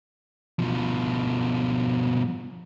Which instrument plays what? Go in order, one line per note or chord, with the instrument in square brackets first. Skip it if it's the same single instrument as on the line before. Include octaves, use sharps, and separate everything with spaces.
[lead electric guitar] B2 F3